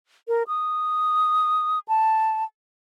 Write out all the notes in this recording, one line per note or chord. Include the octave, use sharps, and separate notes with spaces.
A#4
D#6
A5